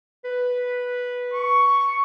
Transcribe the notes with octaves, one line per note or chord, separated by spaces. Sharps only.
B4
C#6